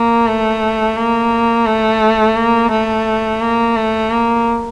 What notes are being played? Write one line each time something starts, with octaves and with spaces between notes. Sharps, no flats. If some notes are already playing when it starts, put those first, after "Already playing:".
Already playing: A#3
A3
A#3
A3
A#3
A3
A#3
A3
A#3